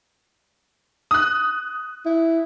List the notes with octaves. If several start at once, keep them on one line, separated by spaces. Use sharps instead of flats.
D#6 F#6
E4